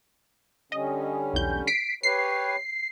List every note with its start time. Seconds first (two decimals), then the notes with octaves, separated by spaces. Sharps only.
0.72 D3 G3 C#4 D#5
1.34 B1 E2 G6
1.67 B6 C7 D7
2.03 G4 B4 C#5 C7